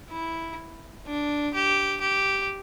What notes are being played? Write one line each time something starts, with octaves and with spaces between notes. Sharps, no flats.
E4
D4
G4
G4